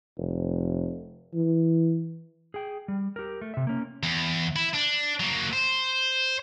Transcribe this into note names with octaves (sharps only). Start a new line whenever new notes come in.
F1
E3
G#4 G5
G3
G4 A#4
A3
C3 E5
A#3 C#4
E2
E4
D4
F#3 A#3
C5